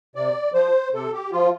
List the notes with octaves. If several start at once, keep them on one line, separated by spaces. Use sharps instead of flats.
C3 D5
F3 C5
C3 A4
G4
F3 F4